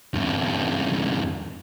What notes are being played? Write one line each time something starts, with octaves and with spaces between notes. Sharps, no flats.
E2 G2